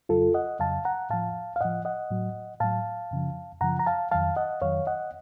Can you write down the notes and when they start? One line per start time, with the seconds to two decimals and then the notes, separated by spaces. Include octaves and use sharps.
0.09 F2 C#3 F#3 F4 A4
0.34 D#5 F#5
0.59 F2 C#3 F#3 F5 A5
0.85 F#5 A#5
1.10 A2 F3 F5 A5
1.56 F5
1.61 A2 F3 D#5 F#5
1.85 D#5 F#5
2.10 A2 F#3
2.60 A2 F#3 F5 A5
3.11 F#2 C#3 F3
3.61 F#2 C#3 F3 F#5 A#5
3.79 A#5
3.86 F5 A5
4.11 F2 D#3 F#3 F5 A5
4.36 D#5 F#5
4.61 F2 D#3 F#3 C#5 F5
4.87 D#5 F#5